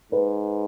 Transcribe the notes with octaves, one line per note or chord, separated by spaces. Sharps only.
G#2 B4